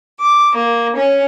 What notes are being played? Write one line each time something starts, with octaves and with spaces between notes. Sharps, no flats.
D6
A#3
C#4